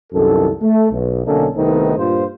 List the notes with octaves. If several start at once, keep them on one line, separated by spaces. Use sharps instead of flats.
C2 F#2 D#3 A4
A3
B1
B1 D3 A#3 C#4 D#4 A4
C2 D#3 A3 B3 C4 D#4
G2 A#2 F4 C5